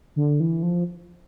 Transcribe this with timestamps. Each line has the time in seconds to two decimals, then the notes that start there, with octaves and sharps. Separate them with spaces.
0.16 D3
0.40 E3
0.63 F3